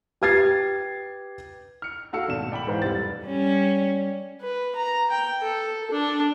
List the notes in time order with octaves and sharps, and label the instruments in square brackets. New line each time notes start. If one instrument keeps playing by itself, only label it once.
[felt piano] G4 B4 G#6 A6 C7
[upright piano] F6 C#7
A3 F#4 A4 F5 E6 C#7
G#1 B2 E7
D5 G5 B5 F#7
G#2 E3 B4 C5 F5
F1 G3 A6
[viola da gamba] G3 C#4
[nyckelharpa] B4
A#5
G5
A4
D4